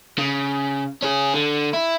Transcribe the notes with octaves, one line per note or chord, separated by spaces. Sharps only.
C#3
C#4 G#4
D3
E4